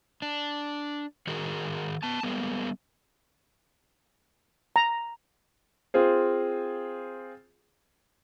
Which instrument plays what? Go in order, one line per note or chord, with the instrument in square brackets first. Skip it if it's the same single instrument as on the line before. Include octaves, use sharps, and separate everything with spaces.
[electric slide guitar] D4
D#3 F#4 G#4 A#4
B3 A5
G3 G#3 A#3 B3
[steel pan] A#5
[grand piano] C4 F4 G#4 C5